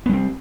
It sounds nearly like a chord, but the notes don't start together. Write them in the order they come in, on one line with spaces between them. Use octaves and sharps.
B3 G3 C4